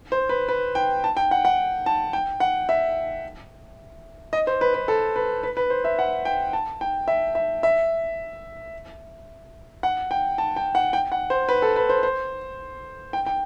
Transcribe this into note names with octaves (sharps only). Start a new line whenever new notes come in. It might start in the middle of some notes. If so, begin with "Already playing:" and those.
C5
B4
B4
G5
A5
G5
F#5
F#5
A5
G5
F#5
E5
D#5
C5
B4
B4
A4
B4
B4
B4
C5
E5
F#5
G5
A5
G5
E5
E5
E5
F#5
G5
A5
G5
F#5
G5
F#5
C5
B4
A4
B4
C5
C5
G5
G5